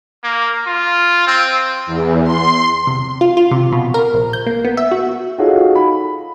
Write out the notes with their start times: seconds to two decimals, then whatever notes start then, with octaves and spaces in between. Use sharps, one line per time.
0.24 A#3
0.67 F4
1.27 C4
1.86 E2
2.23 C6
2.87 C3
3.21 F4
3.37 F4
3.51 C3
3.72 B2
3.94 A#4
4.14 A#1
4.33 G6
4.46 A#3
4.65 B3
4.77 E5
4.91 F#4
5.38 D#4 F4 F#4 G#4 A4 C#5
5.75 B5